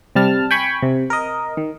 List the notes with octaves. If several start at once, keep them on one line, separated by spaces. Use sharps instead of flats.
C3 G3 A5 F6
G5 G#5 B5 C#6
C3
A#4 D#5
D#3